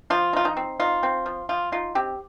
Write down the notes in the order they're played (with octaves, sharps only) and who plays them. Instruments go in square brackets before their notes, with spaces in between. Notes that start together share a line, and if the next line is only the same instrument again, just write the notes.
[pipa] F3 F4
D#4
F4
D#4
C4
D#4 F4
C4
F3
F3 F4
D#4 F4
C4 G4